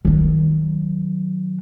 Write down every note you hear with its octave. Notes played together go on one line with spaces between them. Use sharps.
D#3 F#3